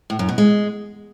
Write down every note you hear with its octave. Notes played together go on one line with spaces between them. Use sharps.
A2
F#2
B2
G#3